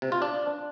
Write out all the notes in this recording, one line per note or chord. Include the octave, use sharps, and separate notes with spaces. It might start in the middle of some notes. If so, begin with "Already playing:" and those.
C3
F4
D4